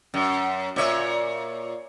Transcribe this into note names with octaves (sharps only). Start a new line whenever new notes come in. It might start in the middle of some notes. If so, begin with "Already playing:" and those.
F#2
A#2 C#5 E5